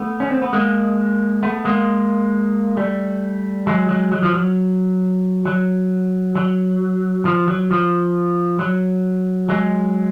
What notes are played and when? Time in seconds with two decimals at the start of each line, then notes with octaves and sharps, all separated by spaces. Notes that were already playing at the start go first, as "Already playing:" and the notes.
Already playing: A3 B3
0.20 C#4
0.30 C4
0.42 B3
0.53 G#3 A#3
1.43 A3 B3
1.65 G#3 A#3
2.77 G3 A3
3.67 F#3 G#3
3.89 F#3 G#3
4.12 F#3
4.23 F3
4.34 F#3
5.46 F#3
6.35 F#3
7.25 F3
7.48 F#3
7.71 F3
8.59 F#3
9.49 F#3 G#3